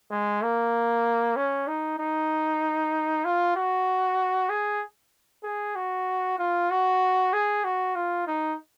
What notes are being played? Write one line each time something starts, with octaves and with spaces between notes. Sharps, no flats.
G#3
A#3
C#4
D#4
D#4
F4
F#4
G#4
G#4
F#4
F4
F#4
G#4
F#4
F4
D#4